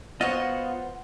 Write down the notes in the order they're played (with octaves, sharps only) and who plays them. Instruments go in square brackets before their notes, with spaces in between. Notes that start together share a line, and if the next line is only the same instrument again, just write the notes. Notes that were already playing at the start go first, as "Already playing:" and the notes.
[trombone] B3 [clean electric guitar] F4 F#4 C#5 [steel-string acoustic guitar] C5 F#5 [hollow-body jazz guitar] D#5